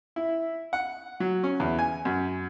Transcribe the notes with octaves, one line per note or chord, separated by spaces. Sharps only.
E4
F#5
F#3
C#4
E2
G#5
F#2